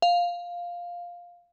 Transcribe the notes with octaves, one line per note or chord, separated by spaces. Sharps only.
F5